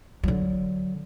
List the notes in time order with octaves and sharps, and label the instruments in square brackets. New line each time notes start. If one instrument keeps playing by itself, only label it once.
[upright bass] D3 F#3